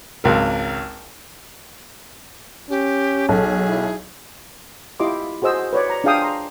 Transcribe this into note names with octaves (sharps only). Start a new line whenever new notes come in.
G#1 C#2 A#4
C#4 G4
B1 G#4 A4
E4
E4 F4 G4 D#5 C6 D6
F#4 G#4 C5 D#5 E6
B4 C#5 D5
A#5
D4 F4 G#4 F5 G5 D#6
A#5 C6